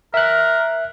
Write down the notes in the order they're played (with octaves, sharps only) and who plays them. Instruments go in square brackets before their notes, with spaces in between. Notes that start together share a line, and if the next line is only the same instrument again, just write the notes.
[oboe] A#4 [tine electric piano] E5 F#6